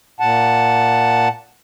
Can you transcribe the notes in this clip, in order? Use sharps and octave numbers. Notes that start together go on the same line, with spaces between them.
A#2 F#5 A5